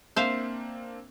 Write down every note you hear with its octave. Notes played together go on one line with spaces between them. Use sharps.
A#3 C4 D4 C5 E5 F5